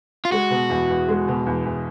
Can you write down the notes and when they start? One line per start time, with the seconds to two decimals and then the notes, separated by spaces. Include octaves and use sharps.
0.25 F4
0.32 G#3 F#4
0.50 B2
0.70 E2
0.89 E2
1.08 G#3
1.28 B2
1.46 E2
1.65 E2